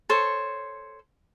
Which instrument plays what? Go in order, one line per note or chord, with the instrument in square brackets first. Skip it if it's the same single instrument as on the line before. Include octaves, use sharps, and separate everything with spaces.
[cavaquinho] A4 C5 C#5